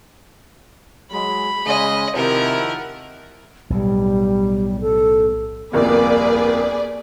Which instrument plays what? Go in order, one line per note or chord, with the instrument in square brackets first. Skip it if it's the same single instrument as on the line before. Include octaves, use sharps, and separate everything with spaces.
[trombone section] F#3 G#3 [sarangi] B5
[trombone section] C#3 G#3 [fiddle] D#5
[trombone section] C3 [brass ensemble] D#3 F3 E4 [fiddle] A#4 [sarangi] F#5
[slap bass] B1 A2 [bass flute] G3
[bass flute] A4
[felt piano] G1 C2 F2 [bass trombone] A#3 [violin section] G#4 B4 D5 [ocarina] A#4